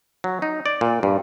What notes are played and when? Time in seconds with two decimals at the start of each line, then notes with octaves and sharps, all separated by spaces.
0.24 F#3
0.42 D#4
0.66 D5
0.81 A#2
1.03 G2